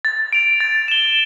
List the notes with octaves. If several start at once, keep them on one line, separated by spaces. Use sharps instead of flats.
A6
D7 F7
A6
E7 G7